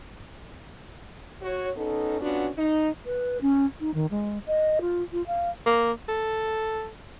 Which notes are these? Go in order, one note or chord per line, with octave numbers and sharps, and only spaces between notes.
F#4 C#5
B3 C#4 D#4 A4
B3 C#4 D4 F4 F#4
D#4
B4
C#4
D#4
D#3
G#3
D#5
F4
F4
F5
A#3
A4